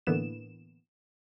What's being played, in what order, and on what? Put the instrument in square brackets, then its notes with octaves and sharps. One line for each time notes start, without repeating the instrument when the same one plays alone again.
[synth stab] A2 D3 E3 A#3 B3 E7